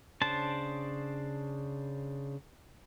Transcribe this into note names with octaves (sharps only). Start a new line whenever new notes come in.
C#3 D4 C5 A5